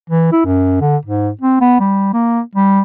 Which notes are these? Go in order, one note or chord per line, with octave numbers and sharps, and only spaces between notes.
E3
E4
F#2
D3
G#2
C4
B3
G3
A#3
G3